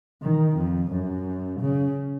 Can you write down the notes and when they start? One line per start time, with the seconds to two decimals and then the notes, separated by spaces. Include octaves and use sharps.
0.22 D#3
0.57 F2
0.91 F#2
1.60 C#3